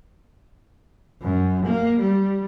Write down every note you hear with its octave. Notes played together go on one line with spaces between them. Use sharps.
F#2
A#3
G3